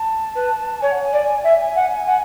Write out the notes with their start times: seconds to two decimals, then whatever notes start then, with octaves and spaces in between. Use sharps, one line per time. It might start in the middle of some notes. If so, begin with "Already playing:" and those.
Already playing: A5
0.35 B4
0.81 C#5 G#5
0.92 F#5
1.03 G#5
1.12 D5
1.44 E5
1.75 F#5
2.07 F#5